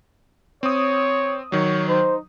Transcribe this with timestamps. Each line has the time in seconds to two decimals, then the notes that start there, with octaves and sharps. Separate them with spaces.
0.63 C4 C#5 D#6
1.52 D#3 F#3 C#5
1.89 D#4 C5